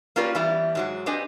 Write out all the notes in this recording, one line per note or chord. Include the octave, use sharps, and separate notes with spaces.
A#3 C#4 F4 G4 B4 D5
E3 G3 B3 C#4 E4
G#2 F#3 G#3
C4 D4 G4 B4 D#5 G#5